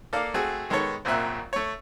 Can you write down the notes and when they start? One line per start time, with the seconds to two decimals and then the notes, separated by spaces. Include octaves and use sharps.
0.13 A#3 A4 D5 F5
0.34 A3 C4 F#4 G#4
0.70 D#3 G#3 B3 A4 C#5
1.05 A#1 F#2 A#2 C4 E5 F#6
1.53 A3 C#5